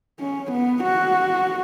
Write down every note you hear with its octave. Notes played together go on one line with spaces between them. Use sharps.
C#4
B3
F#4